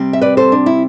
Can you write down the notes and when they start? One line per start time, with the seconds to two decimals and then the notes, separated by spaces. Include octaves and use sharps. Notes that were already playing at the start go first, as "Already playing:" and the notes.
Already playing: C3 G3 C4
0.13 E5
0.21 B4 D5
0.37 A4 C5
0.52 D4
0.66 E4